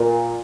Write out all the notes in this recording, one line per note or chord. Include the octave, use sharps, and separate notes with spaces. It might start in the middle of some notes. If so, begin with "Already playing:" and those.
Already playing: A#2